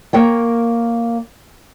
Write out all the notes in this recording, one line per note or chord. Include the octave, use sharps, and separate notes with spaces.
A#3 A#4 C#5 G5